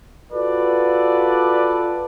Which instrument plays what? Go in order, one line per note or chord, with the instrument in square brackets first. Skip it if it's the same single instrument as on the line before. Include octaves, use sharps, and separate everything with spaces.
[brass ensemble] F4 F#4 A4 B4 D5